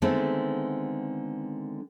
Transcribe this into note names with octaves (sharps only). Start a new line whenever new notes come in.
D3 D#3 G#3 A3 B3 C4